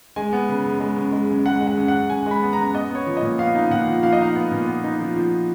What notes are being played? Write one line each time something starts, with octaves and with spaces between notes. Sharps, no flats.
G#3 G#5
B3
C#3
F#2
G#3
F#2
G#3
F#2
G#3 F#5
G#3
F#5
F#2
F#5
F#2
F#2 G#5
G#3 B5
B3
A#5
F#2
B3 D#5
B3 C#5
F3
D#5
A#2
B3 F5
D#4
A#2 F#5
F3
F3 F5
D#5
D#4 F5
B3
A#2
B3
D#4
F3
F3